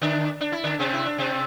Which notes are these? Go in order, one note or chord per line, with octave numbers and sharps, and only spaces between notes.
D3 D4
D4
E4
D3 D4
C3 C4
E4
D4
C3 C4